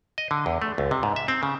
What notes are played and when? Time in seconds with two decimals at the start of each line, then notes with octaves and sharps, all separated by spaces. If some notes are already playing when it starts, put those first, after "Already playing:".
0.18 D#5
0.31 D3
0.46 E2
0.62 A3
0.78 C#2
0.91 C3
1.03 G#2
1.16 E5
1.28 C4
1.43 C#3